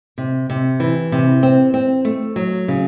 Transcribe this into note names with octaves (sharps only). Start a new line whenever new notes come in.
C3
C3
E3
C3
C4
C4
A3
F#3
C#3